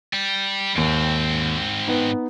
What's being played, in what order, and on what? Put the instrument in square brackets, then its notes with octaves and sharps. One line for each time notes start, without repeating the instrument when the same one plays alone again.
[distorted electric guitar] G3
[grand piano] D#2 D7 [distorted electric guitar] G#2 C4
[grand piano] B3 D#4